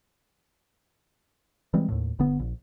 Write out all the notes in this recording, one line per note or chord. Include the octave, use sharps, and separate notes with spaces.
E3 G3 G#3 C4
D#2 A2
G1 D3 B3
A#1